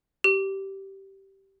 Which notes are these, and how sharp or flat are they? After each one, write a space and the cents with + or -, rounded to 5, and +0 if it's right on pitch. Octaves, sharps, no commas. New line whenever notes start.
G4 -15